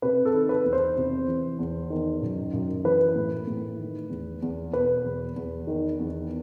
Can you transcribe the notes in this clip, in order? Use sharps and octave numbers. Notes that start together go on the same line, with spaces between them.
C3 B4
A4
D#3
B4
E2
C5
C3
E3
E2
D#3
F#2
F#2
E3 B4
A2
A2
D#3
E2
E2
B2 B4
E2
E2
D#3
E2